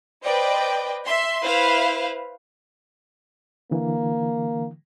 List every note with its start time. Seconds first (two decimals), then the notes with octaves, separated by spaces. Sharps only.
0.24 B4 C5 D5 D#5 G5
1.05 E5 C6
1.43 E4 B4 C5 F5
3.71 D3 E3 A#3